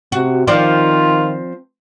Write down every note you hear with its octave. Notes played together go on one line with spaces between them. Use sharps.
C3 F#4
D#3 F3 C4 F4 D5